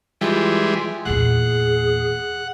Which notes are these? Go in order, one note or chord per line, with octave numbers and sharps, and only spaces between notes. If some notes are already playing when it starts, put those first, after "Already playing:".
E3 G3 G#3 F4
E2 A#2 G#4 F#5